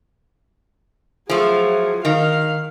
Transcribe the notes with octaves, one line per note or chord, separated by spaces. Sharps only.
F3 F#3 A3 G#4
D#3 F5